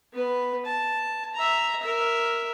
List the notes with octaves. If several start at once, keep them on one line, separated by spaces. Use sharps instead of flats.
B3 B4
A5
E5 A#5
A#4 E5